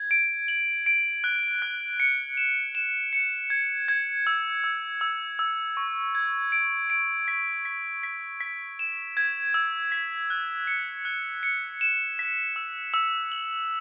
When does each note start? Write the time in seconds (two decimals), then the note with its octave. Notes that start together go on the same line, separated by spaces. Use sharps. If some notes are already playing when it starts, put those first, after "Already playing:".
Already playing: G#6
0.11 D7
0.48 F#7
0.86 D7
1.24 F#6
1.62 F#6
2.00 C#7
2.37 E7
2.75 E7
3.13 C#7
3.50 G#6
3.88 G#6
4.27 E6
4.64 E6
5.01 E6
5.39 E6
5.77 C#6
6.15 G#6
6.52 D7
6.90 D7
7.28 B6
7.65 B6
8.03 B6
8.41 B6
8.79 E7
9.17 G#6
9.54 E6
9.92 B6
10.30 F#6
10.67 C#7
11.05 F#6
11.43 C#7
11.81 E7
12.19 B6
12.56 E6
12.94 E6
13.32 F#7